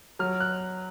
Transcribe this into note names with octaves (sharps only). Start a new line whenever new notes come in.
F#3 F6
F#6